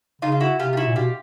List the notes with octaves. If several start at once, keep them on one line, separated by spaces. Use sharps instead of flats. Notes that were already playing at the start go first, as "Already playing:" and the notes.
C#3 D#4 F4
F4
E4 F#4
C3 F4 G4
F4
E4 F#4
A#2
B2 F4 G4